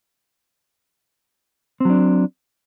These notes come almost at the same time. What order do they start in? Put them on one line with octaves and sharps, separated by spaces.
C4 F#3 D4